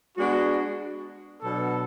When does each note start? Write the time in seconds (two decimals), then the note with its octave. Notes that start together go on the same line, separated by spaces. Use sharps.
0.18 G#3 B3 D4 F#4
1.42 B2 F#3 B3 D4 A4